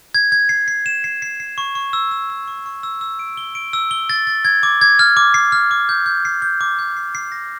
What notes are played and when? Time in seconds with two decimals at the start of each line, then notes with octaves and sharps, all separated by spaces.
0.15 G#6
0.32 G#6
0.49 C7
0.68 C7
0.86 E7
1.04 C7
1.22 C7
1.40 C7
1.58 C#6
1.75 C#6
1.93 E6
2.11 E6
2.30 E6
2.48 C#6
2.66 C#6
2.83 E6
3.01 E6
3.19 D7
3.37 G7
3.55 D7
3.73 E6
3.91 G7
4.09 A6
4.27 A6
4.45 G#6
4.63 D6
4.81 G#6
4.99 F6
5.17 D6
5.34 C7
5.52 F6
5.71 D6
5.89 G6
6.06 G6
6.25 C7
6.42 G6
6.61 D6
6.79 G6
6.97 C7
7.15 C7
7.32 A#6